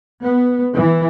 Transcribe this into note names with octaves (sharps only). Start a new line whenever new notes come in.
B3
E3